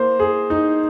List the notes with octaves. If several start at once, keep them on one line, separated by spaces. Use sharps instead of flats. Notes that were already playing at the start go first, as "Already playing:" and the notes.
Already playing: A#3 C5
G#4
D#4